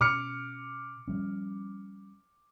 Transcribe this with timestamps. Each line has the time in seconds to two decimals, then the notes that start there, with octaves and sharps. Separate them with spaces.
0.01 B2 C#4 D6 F6 C#7
1.08 F3 G3 C#4